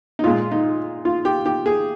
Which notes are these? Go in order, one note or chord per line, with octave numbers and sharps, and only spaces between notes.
D#4
A#2 G#3 F4
D#4
F4
G4
G4
G#4